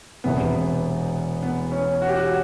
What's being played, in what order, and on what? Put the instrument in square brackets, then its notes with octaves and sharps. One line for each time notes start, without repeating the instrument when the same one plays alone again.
[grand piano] E1 E2 C3 [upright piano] B3
[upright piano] B3
C#4
F#4
G4
F#4